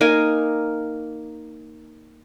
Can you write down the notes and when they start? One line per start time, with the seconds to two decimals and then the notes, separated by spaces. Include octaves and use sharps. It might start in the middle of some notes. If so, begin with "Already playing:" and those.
0.01 A#3 D#4 A#4 G#5